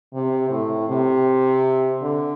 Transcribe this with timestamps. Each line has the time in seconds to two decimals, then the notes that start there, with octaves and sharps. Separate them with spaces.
0.14 C3
0.51 A2
0.88 C3
2.02 D3